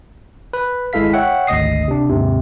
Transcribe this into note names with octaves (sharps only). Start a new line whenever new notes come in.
B4
G#1 G#3 E4 A4 F5 B6
C#5 E5 F#5 G5
G#1 D2 D#5 D#6 C7
C3 D4
D#2 G#2 C3